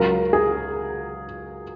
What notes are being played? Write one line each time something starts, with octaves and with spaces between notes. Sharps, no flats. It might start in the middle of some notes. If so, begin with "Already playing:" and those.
Already playing: C#2 C#3 F#3 A#4
G#4